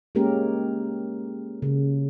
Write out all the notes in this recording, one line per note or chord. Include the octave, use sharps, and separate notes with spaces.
G#3 A#3 C#4 G4 A#4
C#3